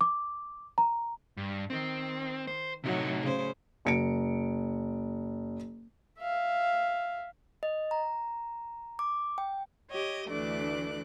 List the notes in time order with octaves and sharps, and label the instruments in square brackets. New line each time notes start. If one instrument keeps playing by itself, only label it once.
[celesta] D6
A#5
[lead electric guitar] G2
[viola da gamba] D#3 [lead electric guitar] C4
[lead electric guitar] C5
[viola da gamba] A2 F#3 A3 [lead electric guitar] C3 D#4
[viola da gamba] C#3 C5
[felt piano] F#1 C#7 D7
[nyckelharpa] E5 F5
[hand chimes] D#5
A#5
D6
G5
[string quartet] G4 C#5 D#5
D2 E3 A3 D4 D6 F#6